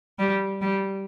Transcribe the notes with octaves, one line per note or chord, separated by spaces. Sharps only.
G3
G3